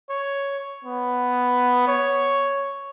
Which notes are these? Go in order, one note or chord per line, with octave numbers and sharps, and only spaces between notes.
C#5
B3
C#5